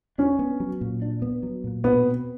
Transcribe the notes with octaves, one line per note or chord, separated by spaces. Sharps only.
C#4 D4
B3
F#3
A#2
D4
B3
F#3
A#2
B2 B3
C4